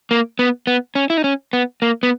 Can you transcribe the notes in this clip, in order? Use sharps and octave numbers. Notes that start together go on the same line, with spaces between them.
A#3
B3
B3
C#4
E4
D#4
C#4
B3
A#3
B3